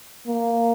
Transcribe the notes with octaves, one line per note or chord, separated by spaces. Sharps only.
A#3